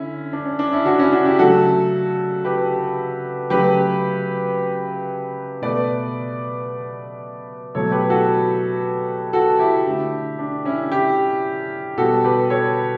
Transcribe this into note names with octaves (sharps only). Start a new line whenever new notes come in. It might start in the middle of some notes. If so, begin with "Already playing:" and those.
Already playing: D3 C#4 E4
D4
C#4
D4
C#4 E4
D4 F#4
C#4 E4
D4 F#4
E4 G4
C#3 F#3 A3 F#4 A4
G4 B4
C#3 F#3 A3 G4 B4
B2 A3 B4 D5
B2 F#3 A3 A4 C#5
G4 B4
F#4 A4
F#4 A4
E4 G4
D3 A3
D4
C#4 E4
E4 G4
B2 G3 F#4 A4
G4 B4
A4 C#5